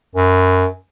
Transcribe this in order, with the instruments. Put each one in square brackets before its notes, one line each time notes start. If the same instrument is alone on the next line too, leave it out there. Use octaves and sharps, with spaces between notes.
[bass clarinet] F#2